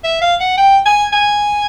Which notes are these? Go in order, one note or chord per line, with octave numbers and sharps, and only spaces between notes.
E5
F5
F#5
G5
G#5
G#5